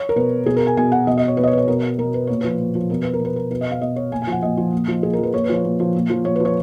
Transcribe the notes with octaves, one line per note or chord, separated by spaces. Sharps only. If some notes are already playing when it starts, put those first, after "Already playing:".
Already playing: C#5
A#4
B2 B4
B2 G#4
A#4
G#5
B2 G#5
F#5
B2 D#5
D#5
C#5
B2 B4
D#5
C#5
B4
C#5
B2 A#4
B2 A#4
B4
A#2 C#5
F3 B4
A#2
F3
B2 A#4
B4
A#4
B2 B4
A#4
B2 B4
D#5
F5
B2 D#5
C#5
A#2 G#5
G#5
F3 F#5
A#2 D#5
F3
A#2
F3
A#2 G#4
F3 A#4
B4
A#2 C#5
B4
F3 C#5
A#2
F3
A#2
F3
A#2 C#5
B4
F3 C#5